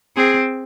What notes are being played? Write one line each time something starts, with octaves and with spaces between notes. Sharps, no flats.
C4 G#4